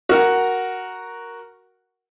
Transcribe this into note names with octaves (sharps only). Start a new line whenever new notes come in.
F#4 A#4 F#5